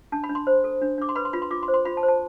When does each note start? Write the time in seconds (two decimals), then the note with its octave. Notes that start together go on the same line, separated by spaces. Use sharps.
0.12 D4 A5
0.24 B5
0.29 D4
0.35 C6
0.47 C5
0.64 A4
0.82 D4
0.98 D4 D6
1.09 C6
1.15 B4 B5
1.25 C6
1.33 F4 B5
1.42 C6
1.51 F4 D6
1.63 C6
1.68 C5
1.74 C6
1.85 F4 B5
1.97 A5
2.03 C5
2.08 A5